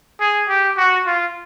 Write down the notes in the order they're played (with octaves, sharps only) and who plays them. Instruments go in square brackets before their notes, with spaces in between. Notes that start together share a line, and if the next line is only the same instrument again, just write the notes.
[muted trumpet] G#4
G4
F#4
F4